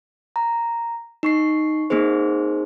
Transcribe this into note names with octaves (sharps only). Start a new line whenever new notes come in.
A#5
D#4 C#6 C7
A#3 C4 D#4 G#4 C5